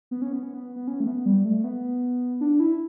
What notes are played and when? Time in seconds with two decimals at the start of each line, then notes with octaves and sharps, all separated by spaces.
0.11 B3
0.22 C#4
0.33 B3
0.43 C#4
0.54 B3
0.76 B3
0.88 C#4
1.00 A3
1.07 B3
1.26 G3
1.45 A3
1.58 A3
1.64 B3
2.41 D4
2.60 E4